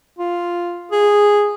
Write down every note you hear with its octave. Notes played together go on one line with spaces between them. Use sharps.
F4
G#4